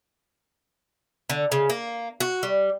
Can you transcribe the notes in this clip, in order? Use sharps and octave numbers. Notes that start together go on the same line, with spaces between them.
D3
C#3
A#3
F#4
G3